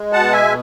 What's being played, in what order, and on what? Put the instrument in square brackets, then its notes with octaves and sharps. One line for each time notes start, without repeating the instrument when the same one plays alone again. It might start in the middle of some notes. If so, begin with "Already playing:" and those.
Already playing: [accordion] G#3
B2 F#5 A5
E5 G#5